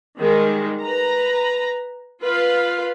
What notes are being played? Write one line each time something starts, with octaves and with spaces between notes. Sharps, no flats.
D#3 G3 G#3
B4 A#5
F4 B4 F5